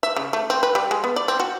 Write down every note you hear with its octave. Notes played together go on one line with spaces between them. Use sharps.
E5
C#3
A3
C4
B4
G3
G#3
B3
D5
C4
F#4